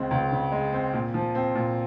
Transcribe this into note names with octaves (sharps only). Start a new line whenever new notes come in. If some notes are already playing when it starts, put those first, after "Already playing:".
Already playing: C#2 C#3 G#3 C4
C#2
C#3
G#3
C4
A#2
F3
C4
A#2